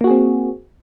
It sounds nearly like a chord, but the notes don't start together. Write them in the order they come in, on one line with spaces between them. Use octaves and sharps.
A#3 F#4 G#4 C4